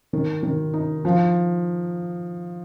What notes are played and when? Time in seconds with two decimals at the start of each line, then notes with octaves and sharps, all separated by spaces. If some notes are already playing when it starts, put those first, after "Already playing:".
0.13 D#3
0.43 D#3
0.74 D#4
1.05 F3